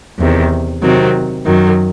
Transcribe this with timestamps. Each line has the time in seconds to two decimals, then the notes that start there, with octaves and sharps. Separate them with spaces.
0.19 E2 C3 D#3
0.83 C3 D#3 F#3 C4
1.46 F#2 D#3 F#3